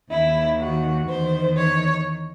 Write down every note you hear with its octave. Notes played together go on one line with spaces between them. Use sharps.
D#2 D#3 E4
F#4
E2 D#3 C5
C#5